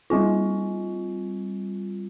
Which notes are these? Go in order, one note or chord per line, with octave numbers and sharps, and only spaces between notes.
G3 C4 F4